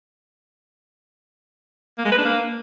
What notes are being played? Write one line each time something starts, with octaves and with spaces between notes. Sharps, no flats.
A#3
G#3
B4
D4
A#3